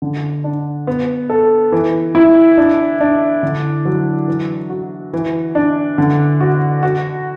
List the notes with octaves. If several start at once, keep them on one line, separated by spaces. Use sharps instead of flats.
D3
D4
B3
A4
E3
E4
D4
D4
D3
F#3
E3
F#4
E3
D4
D3
F#4
F#4